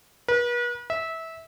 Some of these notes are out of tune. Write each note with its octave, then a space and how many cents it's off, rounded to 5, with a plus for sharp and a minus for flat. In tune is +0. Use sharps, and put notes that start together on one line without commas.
B4 -40
E5 -20